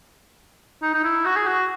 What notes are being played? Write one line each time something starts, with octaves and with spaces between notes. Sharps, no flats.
D#4
D#4
E4
F#4
G#4
F#4